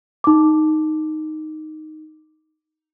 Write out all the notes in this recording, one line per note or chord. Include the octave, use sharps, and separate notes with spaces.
D#4 D6